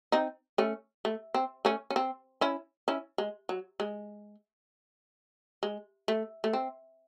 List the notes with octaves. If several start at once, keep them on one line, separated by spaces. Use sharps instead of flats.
C4 D#4
A3 C#4
A3
C4
A3 C#4
C#4
C4
C#4 E4
C#4 E4
G#3
F#3
G#3
G#3
A3
A3
C4